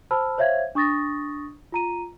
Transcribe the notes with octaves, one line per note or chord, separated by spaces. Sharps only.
C5 A5 B5 E6 F6
C5 C#5 E5 F5 G#6
D4 C#6 D#6 A6 A#6
F4 A#5 D#7